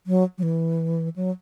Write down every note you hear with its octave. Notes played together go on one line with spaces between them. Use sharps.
F#3
F#3
E3
F#3